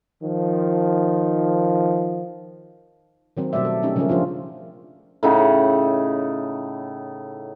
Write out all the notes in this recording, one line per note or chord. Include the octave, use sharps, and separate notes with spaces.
D#3 F3
D#3 F#3 C4
B2 F#3 G3 A3 D5 E5
A4
A3 C#4 D#4 G4
C#3 F3 G3 G#3 C#4 A#4
F3 D4 F4 G4
A2 C#3 D#4 F#5